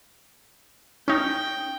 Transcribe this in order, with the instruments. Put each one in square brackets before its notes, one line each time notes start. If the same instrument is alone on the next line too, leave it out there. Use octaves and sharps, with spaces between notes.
[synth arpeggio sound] C#4 D#4 [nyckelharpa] G5